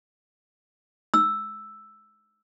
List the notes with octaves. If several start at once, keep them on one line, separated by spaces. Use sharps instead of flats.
E6